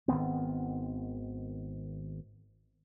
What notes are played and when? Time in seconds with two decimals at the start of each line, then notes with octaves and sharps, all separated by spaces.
0.08 G#1 D#3 B3 C4